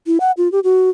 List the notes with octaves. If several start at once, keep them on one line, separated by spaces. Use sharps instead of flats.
E4
F#5
F4
G4
F#4